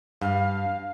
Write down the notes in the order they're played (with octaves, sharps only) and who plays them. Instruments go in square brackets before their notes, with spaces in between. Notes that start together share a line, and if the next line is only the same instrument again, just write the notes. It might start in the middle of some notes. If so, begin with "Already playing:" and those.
[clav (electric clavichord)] G2 [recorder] F5